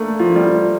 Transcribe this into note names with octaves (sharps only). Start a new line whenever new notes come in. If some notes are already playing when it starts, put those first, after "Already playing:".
Already playing: A3 A#3 D4
F3
G3
F3